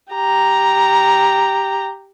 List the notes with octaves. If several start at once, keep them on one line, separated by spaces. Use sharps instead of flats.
G4 A#5